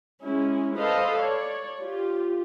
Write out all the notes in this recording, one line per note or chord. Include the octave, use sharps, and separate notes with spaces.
G#3 C#4 E4
A4 B4 C5 D#5 F5 A5
C#5 D5
F4 G4